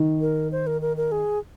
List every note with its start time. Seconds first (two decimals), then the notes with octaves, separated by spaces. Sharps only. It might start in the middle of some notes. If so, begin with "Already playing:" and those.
Already playing: D#3
0.21 A#4
0.52 C5
0.67 A#4
0.82 A#4
0.97 A#4
1.12 G#4